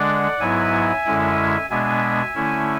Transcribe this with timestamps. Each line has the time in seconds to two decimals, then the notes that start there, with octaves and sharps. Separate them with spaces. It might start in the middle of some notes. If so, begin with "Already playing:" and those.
Already playing: D3 G#3 D4 D5 F#5
0.40 G#2 F#3 B3 E4 E5 G#5
1.05 F#2 D3 G#3 C#4 E4
1.70 B2 G#3 B3 D4 E5 G#5
2.35 D3 A3 C#4 E4